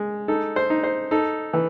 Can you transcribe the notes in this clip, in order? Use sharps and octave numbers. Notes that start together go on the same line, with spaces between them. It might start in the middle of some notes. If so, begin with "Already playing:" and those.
Already playing: G#3
D#4 A4
C5
D#4
C5
D#4 A4
E3